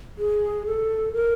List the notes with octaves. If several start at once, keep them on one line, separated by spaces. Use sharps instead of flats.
G#4
A4
A#4